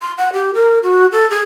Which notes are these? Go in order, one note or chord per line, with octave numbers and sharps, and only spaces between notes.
C6
F#5
G4
A#4
F#4
A4
G#4